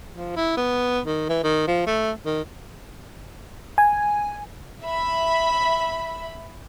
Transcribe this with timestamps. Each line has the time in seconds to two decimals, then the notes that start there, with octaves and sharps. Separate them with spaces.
0.14 F3
0.37 E4
0.57 B3
1.06 D#3
1.29 E3
1.43 D#3
1.68 F3
1.87 A3
2.26 D#3
3.78 G#5
4.82 E5 B5